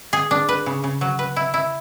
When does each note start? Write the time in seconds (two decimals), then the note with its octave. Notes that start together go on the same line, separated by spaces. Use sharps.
0.13 G#4
0.31 D4
0.49 B4
0.66 C#3
0.84 C#3
1.01 F#3
1.19 B4
1.36 E4
1.54 E4